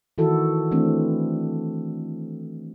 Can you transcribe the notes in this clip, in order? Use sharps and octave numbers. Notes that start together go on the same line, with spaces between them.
D#3 E3 E4 F#4 A4
E3 A3 C4 D4